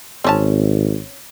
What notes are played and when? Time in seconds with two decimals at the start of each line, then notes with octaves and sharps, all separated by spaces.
0.24 G#1 C4 C#4 A5